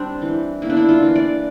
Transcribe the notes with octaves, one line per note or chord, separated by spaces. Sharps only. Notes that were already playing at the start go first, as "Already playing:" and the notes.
Already playing: G3 C4 D4
E3
A#3 E4
D4
E4
F4
E3
D5